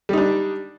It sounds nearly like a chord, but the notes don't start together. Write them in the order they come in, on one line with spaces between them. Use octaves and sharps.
G3 D#4 D4